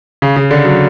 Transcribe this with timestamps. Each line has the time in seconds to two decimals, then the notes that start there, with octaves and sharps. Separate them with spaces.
0.22 C#3
0.36 C#3
0.51 D3
0.65 F#3